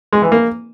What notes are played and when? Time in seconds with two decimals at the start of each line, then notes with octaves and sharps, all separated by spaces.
0.13 G#3
0.22 E3
0.32 A#3